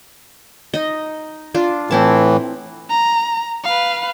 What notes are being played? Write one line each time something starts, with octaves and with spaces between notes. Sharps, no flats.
D#4 D#5
D4 F4
A2 E3 C4 E4 A5
A#5
B4 F5